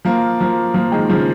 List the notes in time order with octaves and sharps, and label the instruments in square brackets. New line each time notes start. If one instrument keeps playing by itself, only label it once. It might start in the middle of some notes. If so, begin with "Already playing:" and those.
[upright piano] F3 A#3
F3 A#3
F3 A#3
D#3 G#3
C#3 F3